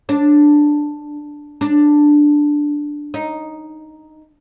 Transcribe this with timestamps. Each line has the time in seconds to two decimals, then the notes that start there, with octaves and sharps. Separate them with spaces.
0.09 D4
1.61 D4
3.14 D#4